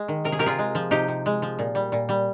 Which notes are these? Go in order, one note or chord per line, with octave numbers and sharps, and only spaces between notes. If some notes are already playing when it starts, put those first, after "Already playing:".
Already playing: G#3
D#3
C3 A#4
G#4
C3 G4 A#4
F4 G#4
G#3
F3
C3 D#4 G4
C3
G#3
F3
A#2
G3
A#2
G3